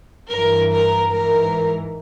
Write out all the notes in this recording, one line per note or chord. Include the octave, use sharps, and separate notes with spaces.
G2 E3 A#4
A#4
G#2 E3 A#4